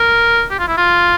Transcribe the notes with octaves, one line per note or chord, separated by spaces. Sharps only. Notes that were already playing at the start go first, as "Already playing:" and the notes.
Already playing: A#4
G4
F4
E4
F4